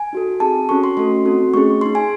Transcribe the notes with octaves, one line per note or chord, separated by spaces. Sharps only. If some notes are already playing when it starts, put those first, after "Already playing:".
Already playing: G#5
D#4 F#4 A4
C4 D#4 G#4 A5
C#4 F#4 A4 C#6
C6
A3 C#4 F#4 A4 C6
C4 D#4 F#4 A4
A3 C#4 G#4 C#6
D#4 G#4 C6
G#5